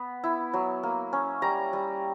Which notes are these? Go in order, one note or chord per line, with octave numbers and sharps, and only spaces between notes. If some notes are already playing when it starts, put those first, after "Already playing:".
Already playing: B3 B5
E4
F#3
A#3
C#4
G3 A#5
G3